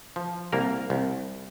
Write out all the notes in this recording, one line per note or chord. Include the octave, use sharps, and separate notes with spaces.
F3
C2 A#3 A#4
C2